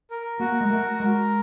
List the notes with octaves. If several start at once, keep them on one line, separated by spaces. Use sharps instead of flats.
A#4
A#3 F#4
G#3
A3 A#4
G#3 A#4